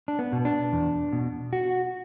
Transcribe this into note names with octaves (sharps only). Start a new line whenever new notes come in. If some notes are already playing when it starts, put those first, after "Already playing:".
D4
B3
B2
D4
E2
B2
F#4